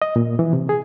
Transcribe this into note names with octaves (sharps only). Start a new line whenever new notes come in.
D#5
A#2
E3
C3
G#4